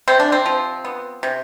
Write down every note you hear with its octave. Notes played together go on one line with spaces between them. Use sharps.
C3 C4
D4
C4
F3
B3
C3